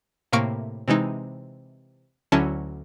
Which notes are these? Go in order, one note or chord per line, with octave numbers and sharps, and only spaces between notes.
A2 C3 A#3 F5 C#6 D7
C3 E3 G#3 D#4
D2 D3 F#3 C#4 E4 A5